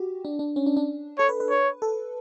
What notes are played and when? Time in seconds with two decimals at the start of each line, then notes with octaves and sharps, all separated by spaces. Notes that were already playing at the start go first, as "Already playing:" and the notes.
Already playing: F#4 G4
0.25 D4
0.39 D4
0.56 C#4
0.66 D4
0.77 D4
1.19 A4 C#5
1.29 B4
1.40 B4
1.50 C#5
1.82 A4